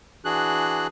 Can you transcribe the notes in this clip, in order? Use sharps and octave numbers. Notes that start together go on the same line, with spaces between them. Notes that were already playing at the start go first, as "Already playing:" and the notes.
E3 D4 F#4 G#4 F#6